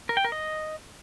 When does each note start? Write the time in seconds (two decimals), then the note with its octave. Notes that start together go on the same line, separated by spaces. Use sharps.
0.09 A#4
0.17 G5
0.24 A#4
0.32 D#5